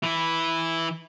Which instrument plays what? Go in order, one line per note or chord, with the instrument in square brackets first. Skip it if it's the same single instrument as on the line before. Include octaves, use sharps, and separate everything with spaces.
[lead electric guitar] E3 E4